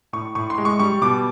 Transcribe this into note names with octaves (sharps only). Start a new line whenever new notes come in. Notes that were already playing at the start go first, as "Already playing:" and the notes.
A2 C#6
A2 C#6
C6
G#3
C#6
G3 C#6
B2 D6